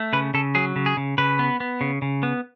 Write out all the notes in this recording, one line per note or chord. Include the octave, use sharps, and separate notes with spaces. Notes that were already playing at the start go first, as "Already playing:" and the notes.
Already playing: A3
C#3 B4
C#3 A4
F#3 G#4
C#3
G#4
C#3
C#3 B4
B3
B3
C#3
C#3
B3